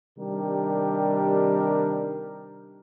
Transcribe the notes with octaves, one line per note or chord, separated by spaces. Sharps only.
C3 D#3 G3 D4 G4 A#4